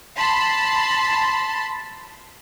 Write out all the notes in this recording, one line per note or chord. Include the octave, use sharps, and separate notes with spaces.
A5 B5 C6